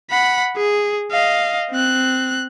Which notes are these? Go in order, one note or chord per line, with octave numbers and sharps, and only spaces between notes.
F#5 B5
G#4
D#5 F5
C4 F#6